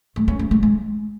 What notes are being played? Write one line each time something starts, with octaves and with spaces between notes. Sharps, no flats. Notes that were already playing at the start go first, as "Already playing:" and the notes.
A3
C#4
A3
A3
G#3